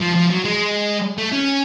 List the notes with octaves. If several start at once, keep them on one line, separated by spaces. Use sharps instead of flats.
F3
F3
F#3
G#3
A3
C#4